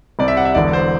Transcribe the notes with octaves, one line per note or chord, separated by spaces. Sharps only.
C2 C3 G3 D5
E5
F#5
E5
E1 E2 D3 D5
C5